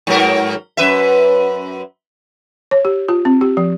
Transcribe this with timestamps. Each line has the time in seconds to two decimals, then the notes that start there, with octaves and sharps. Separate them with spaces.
0.07 G#2 F#3 A#4
0.77 F#2 B4 E5
2.71 C#5
2.85 G4
3.08 F4
3.25 C4
3.41 G4
3.57 F3